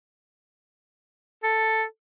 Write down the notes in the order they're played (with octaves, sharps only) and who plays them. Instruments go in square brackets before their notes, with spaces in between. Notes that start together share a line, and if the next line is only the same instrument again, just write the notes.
[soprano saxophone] A4